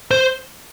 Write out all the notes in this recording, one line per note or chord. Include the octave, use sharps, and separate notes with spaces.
C5